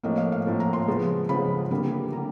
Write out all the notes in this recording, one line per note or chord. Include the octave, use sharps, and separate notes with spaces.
A2 F3 A#3 D#5
F5
F5
A2 F3 A#3
A#5
C6
C#3 F3 G#3 B3
C#3 F3 G#3 B3 B5
D3 G3 A#3 B5
D3 G3 A#5